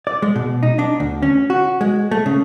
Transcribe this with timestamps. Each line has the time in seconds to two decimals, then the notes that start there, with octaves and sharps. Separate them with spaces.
0.07 D5
0.22 G#3
0.36 B2
0.63 D#4
0.79 D4
1.00 D2
1.22 C#4
1.50 F#4
1.81 G#3
2.11 A3
2.26 C#3